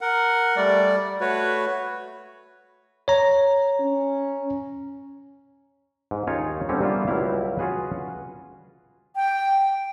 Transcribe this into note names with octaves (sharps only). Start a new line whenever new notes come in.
A#4 F#5
G3 A3 D5
A3 F#4 B4 C#5
C#5 A#5
C#4
G#2
D#2 C#4 D#4 F4 C#5
D3 G3 C4 C#4
G3 A#3 B3 F4 E5 F5
C#2 F#3 G3 E4 F5
C#4 F4 F#4 G#4 B4
G5